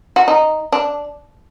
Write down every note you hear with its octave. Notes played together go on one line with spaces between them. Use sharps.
F#4
D#4
D4